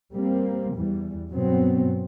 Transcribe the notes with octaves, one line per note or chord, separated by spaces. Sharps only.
G3 A#3 C4
E2 E3 G3
G2 B2 F#3 B3 C4